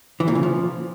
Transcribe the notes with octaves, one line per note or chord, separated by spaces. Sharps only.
E3
A#2
C#3
F3